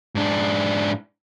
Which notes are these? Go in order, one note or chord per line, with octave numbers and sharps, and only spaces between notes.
G#2 D4